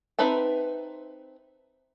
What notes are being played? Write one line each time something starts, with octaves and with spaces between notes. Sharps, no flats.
C4 D#4 B4 E5 A5